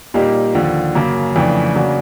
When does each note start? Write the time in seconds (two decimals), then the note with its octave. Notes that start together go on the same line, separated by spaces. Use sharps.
0.14 A#2 G3 A#3 D#4 G4
0.55 D#2 D3 F3
0.95 F#2 C#3 F#3 A#3
1.36 F2 C#3 E3 A3 D4
1.76 C#3 F#3 A#3 D4 F#4